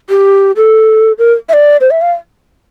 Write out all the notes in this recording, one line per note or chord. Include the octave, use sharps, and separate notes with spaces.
G4
A4
A#4
E5
D5
C5
E5
F5